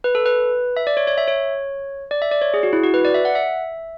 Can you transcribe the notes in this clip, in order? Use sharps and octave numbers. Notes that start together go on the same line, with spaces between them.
B4
A4
B4
E5
D5
C#5
C#5
E5
C#5
D5
E5
D5
C#5
G#4
F#4
E4
F#4
B4
D5
E5
F#5
E5